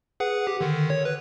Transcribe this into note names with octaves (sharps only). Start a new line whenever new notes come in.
G#4 B4 F#5
G4
D3 D#3
C#5
B4